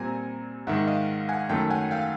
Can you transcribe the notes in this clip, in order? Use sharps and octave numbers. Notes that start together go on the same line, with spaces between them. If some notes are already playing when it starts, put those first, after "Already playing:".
Already playing: A#2 G3 C4 G#5 A#5
G#2 D#3 G#3 E5 F#5
D#5 F5
F#5 G#5
F#2 D#3 F#3 A3 G5 A5
F#5 G#5
F5 G5